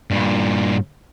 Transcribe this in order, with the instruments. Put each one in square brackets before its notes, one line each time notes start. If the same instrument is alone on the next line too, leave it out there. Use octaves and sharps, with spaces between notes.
[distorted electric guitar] G2 A#2